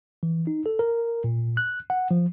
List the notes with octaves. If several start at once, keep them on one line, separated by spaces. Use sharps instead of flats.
E3
D#4
A4
A#4
A#2
F#6
F#5
F3